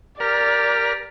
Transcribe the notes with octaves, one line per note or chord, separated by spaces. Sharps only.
G4 A#4 D5 F6